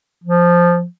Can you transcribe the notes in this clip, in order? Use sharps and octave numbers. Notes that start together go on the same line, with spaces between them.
F3